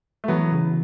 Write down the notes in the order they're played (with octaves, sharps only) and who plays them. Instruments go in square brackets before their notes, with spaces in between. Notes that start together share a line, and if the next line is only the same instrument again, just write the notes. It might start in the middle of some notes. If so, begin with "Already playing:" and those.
[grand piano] A3
[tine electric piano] E3 [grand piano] F#3 B3
[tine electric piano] C#3